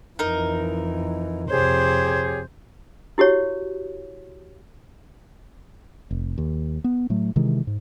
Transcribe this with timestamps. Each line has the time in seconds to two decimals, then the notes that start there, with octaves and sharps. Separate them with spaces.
0.19 F2 E3 D#4 A#4
1.50 F2 C3 G4 G#4 C5 C#5
3.18 E4 F#4 G4 C#5
6.11 F1
6.38 D#2
6.84 B3
7.10 A2 F#3 A3
7.36 C3 D#3 E3 G#3
7.67 G#2